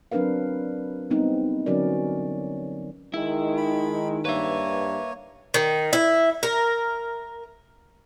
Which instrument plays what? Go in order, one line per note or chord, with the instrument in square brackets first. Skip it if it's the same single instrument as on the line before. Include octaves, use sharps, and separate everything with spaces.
[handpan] F#3 C4 D4 A#4 B4 F5
G3 B3 C4 D#4
D3 F#3 C#4 F#4 A#4 D5
[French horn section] D#3 [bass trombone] G#3 [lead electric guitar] E4
[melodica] B5
[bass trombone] G2 [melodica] A#3 C#5 [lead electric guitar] B4 E5
[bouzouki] D#3
E4
A#4